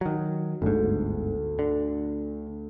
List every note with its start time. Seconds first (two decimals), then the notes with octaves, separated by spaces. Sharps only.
0.01 D#3 F#3
0.62 G1 D2 G#2
1.59 D3